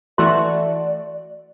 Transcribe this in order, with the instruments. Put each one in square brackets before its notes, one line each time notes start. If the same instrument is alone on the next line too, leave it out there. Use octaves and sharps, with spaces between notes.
[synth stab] E3 A3 F#4 [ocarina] D5 [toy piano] C6